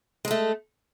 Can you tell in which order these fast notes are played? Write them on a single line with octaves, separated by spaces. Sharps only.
G#3 A4 A3